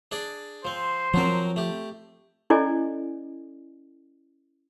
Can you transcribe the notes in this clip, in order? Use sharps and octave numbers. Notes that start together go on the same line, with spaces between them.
D4 G#4 D5
F3 C4 C5
F3 F#3 C4 F#4 A#4
A3 G4
C#4 E4 A4 D5 D#5 G#5